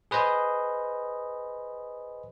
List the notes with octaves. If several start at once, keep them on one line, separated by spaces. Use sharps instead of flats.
G#4 B4 C5 D#5